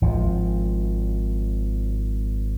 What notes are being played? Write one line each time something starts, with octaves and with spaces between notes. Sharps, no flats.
G#1 F3